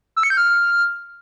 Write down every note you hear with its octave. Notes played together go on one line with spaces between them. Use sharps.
E6
C#7
G6
F6